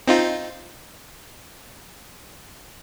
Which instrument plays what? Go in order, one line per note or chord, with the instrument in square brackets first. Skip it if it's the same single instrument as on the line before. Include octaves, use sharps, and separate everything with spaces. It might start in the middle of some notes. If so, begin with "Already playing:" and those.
[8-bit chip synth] C4 D#4 F4